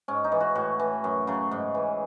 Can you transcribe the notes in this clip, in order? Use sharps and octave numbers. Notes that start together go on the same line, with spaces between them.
G#2 C#4
D#4
E3
F#4
A2 F#4
E3
F#2
C#3 F#3
G#2
E3